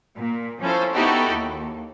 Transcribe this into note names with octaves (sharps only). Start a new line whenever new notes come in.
A#2
F3 C#4 E4 A4 C5
B3 D#4 E4 F#4 G4 A4
D#2